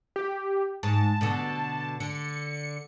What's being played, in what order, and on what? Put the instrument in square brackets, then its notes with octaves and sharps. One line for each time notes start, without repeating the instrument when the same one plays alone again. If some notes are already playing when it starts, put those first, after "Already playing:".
[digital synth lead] G4
[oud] G#2 [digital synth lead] A5
[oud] B2 D3 F#4
[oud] D3 [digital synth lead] C#7